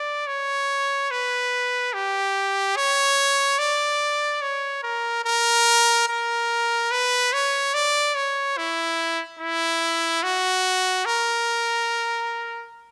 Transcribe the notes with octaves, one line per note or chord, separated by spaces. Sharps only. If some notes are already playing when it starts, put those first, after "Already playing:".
Already playing: D5
C#5
B4
G4
C#5
D5
C#5
A#4
A#4
A#4
B4
C#5
D5
C#5
E4
E4
F#4
A#4